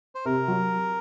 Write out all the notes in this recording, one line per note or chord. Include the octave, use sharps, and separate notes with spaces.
C5
C3 A#4
F#3